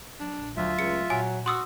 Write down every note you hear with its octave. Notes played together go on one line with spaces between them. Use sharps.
F#3 D4
A#1
D2 F#3 A3 F4 E5
C#2 C#7
A#2 F#3 G#5
F#4 C6 D#6 E6